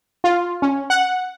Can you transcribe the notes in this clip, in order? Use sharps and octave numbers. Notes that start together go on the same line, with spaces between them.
F4
C#4
F#5